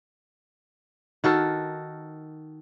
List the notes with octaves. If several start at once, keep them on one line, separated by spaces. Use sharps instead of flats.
D#3 F#4 A4 A#4